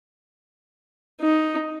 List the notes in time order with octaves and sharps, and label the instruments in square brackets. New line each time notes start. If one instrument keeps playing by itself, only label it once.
[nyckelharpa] D#4